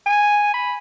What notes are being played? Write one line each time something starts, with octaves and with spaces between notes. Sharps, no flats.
G#5
B5